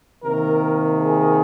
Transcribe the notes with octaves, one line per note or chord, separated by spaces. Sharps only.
C3 D#3 A#3 A#4
G#4